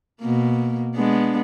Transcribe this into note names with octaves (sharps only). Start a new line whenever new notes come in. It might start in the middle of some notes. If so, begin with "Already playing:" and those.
B2 A#3
G#3 B3 D4